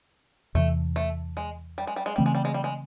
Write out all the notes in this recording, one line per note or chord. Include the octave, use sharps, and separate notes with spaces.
E2 C3 E3 A3
A3
G#3
G3
G#3
G3
G#3
C#3 E3 G3 A3 C4
G#3
G3
G#3
G3
G#3